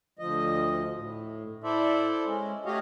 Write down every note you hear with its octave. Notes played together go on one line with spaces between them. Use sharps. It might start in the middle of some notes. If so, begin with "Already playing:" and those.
D2 F3 D#5
A2
E4 A4 C5 D5 E5
G#3 C#4
A3 F#4 G4 C#5 D#5 F5